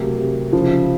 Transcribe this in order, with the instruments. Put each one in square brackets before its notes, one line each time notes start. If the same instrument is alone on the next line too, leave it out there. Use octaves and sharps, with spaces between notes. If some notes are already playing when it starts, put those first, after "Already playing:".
Already playing: [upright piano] C3 [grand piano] F#3 A3 A#3
[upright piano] C3
[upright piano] C#3 [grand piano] F3